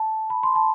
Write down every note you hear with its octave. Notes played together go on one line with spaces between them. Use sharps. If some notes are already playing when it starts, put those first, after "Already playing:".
Already playing: A5
B5
C6
A5